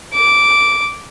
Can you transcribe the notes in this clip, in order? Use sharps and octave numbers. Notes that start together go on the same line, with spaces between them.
D6